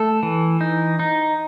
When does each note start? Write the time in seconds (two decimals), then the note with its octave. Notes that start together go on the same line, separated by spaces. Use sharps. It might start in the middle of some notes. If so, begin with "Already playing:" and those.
Already playing: A3 A4
0.23 E3
0.61 D#4
0.99 D#4